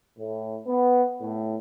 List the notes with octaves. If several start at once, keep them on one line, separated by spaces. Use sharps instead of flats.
A2
B3
A2